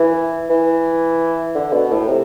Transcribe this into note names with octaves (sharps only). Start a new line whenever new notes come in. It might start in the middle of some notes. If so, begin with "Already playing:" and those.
Already playing: E3
E3
D3
B2
A2
C3